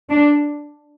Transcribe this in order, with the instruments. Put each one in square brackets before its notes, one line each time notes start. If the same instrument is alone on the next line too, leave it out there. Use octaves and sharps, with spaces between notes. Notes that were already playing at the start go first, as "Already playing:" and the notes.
[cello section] D4